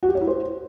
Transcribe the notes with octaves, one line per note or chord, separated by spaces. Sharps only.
F#4
G4
C#5
E4
C5